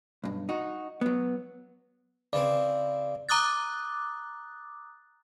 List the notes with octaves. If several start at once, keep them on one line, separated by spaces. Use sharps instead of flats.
B1 G2
D#4 F#4
F#3 B3
C#3 E3 C4 D5
A#5 D6 D#6 F#6 A6